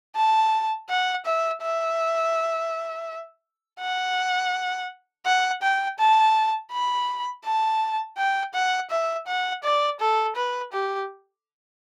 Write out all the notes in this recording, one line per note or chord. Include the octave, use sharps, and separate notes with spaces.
A5
F#5
E5
E5
F#5
F#5
G5
A5
B5
A5
G5
F#5
E5
F#5
D5
A4
B4
G4